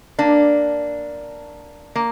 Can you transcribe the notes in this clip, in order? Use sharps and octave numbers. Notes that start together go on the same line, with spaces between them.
A#3 D4
A#3